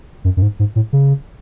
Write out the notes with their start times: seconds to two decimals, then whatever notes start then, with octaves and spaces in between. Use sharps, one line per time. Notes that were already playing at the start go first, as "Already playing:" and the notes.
0.25 F#2
0.37 F#2
0.42 G#2
0.59 G#2
0.76 A2
0.93 C#3